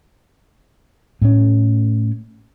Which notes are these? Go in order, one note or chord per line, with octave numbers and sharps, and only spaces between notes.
A2 A3 C#4